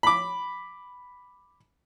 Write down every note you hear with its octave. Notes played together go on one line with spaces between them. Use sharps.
B5 D6